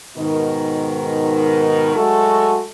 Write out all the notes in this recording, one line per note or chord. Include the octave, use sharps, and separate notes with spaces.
G#2 B2 D#3
F#3 G#3 A3 F#4 A4